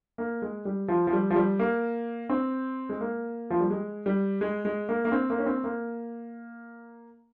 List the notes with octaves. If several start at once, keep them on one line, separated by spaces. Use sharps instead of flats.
A#3
G#3
G3
F3
F3
G3
F3
G3
A#3
C4
G#3
A#3
F3
G3
G#3
G3
G#3
G#3
A#3
A#3
C4
A#3
C#4
C4
A#3